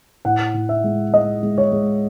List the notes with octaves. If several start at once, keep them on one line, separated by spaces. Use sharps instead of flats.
A2 F#5
A2
E5
G#3
G#3 D#5
G#3
C#5
G#3